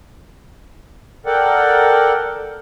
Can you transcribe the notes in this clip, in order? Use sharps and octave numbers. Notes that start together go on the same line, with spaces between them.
A4 A#4 D5 F#5 G5